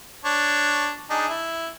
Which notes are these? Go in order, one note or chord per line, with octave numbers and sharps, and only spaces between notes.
D4 C#5
D4 D#4 G#4
E4